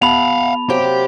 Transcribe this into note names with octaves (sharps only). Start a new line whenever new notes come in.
B3 G4 F5 F#5 A5 B5 F7
C3 F#3 A#3 G4